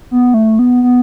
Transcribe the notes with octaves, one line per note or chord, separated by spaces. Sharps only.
B3
A3
B3
B3